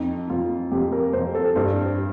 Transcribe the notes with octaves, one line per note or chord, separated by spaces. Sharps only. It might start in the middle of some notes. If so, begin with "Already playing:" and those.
Already playing: F2 D#4
F2 F4
F2 G4
A#4
F2 C5
A4
G2 C5